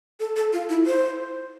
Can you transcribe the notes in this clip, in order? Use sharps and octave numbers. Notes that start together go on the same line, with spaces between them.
A4
A4
F4
E4
C5